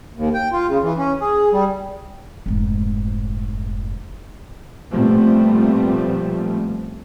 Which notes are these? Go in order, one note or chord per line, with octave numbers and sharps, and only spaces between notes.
D#2
G5
F4
C#3
E3
C#4
G#4
G3
F1 G#2
A#2 F3 G3 A3 B3 C4